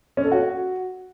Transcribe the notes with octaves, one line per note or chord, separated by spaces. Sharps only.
C#4
A4
F#4